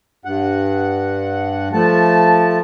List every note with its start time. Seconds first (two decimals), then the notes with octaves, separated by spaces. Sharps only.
0.25 G2 F#5
1.73 F3 A3 A5